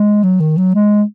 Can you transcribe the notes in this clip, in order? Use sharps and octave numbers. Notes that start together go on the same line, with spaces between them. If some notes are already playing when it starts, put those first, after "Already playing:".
Already playing: G#3
F#3
D#3
F#3
G#3